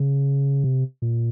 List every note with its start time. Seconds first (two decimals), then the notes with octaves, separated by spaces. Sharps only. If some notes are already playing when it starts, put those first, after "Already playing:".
Already playing: C#3
0.64 C3
1.02 A#2